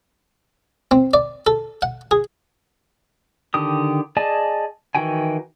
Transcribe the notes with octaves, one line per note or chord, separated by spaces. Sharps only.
C4
D5
A4
F#5
G#4
D3 D#3 G4 D#6
G#4 D5 D#5 G#5 A5
D#3 E3 F#4 G5 G#5